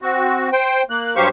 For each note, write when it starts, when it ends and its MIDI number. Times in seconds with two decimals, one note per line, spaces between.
0.02 0.50 60
0.02 0.50 66
0.53 0.83 72
0.53 0.83 79
0.90 1.14 58
0.90 1.14 90
1.16 1.28 43
1.16 1.28 54
1.16 1.28 67
1.16 1.28 72
1.16 1.28 77
1.16 1.28 85